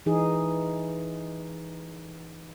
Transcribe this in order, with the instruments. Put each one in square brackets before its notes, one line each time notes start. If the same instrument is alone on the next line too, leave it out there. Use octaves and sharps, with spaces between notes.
[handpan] E3 D#4 G#4